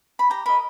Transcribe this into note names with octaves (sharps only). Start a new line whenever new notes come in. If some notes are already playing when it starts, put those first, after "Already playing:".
B5
G4 A#5
A#4 D#5 B5